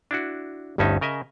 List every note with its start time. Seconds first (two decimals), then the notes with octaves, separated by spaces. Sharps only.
0.11 D4 E4 F#4
0.78 G1 D2 G2 C#4 D#4 E5
1.01 C#3 A#4 D#5 E5 G#5